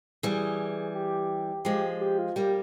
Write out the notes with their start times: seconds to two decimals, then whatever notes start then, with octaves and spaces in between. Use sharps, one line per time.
0.23 E3 G3 G#4
0.95 G4
1.65 F3 G#3 G4
2.01 G4
2.19 F4
2.36 G3 A#3 G4